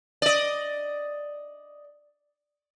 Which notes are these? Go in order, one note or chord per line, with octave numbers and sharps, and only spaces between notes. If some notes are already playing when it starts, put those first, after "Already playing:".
D5 D#5